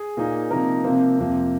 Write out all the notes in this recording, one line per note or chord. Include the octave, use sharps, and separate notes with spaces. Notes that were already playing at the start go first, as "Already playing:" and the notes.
Already playing: G#4 G#5
A#2 A#3 D#4
C3 F3 A#3 D#4 A#4 A#5
C3 F3 A#3 C4 C5
F2 C3 F3 A#3